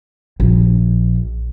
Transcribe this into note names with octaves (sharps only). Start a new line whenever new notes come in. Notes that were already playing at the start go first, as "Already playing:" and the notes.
A#1